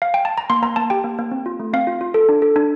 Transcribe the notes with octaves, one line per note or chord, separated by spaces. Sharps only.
F5
G5
A5
A#5
A#3 C6
A#3 A#5
A#3 A5
G4 G5
A#3
A#3
C4
F4
A3
C4 F5
F4
F4
A4
D4
A4
D4